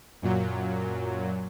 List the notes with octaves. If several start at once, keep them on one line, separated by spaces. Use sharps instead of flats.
F#2 A#2 F#3